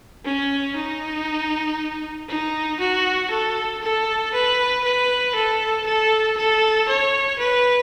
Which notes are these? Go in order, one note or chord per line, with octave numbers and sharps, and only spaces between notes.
C#4
D#4
D#4
F#4
A4
A4
B4
B4
A4
A4
A4
C#5
B4